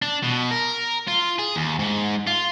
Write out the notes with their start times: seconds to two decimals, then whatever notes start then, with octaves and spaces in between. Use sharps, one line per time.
0.02 D4
0.23 B2
0.51 A#4
1.08 F4
1.38 G#4
1.56 D#2
1.79 G#2
2.27 F4